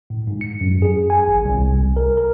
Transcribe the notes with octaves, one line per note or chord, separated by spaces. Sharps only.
A2
G#2
C#7
F#2
G#4
G#5
G#1
C2
C2
A#4
A#4